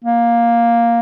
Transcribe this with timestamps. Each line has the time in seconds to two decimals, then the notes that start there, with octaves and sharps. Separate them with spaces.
0.04 A#3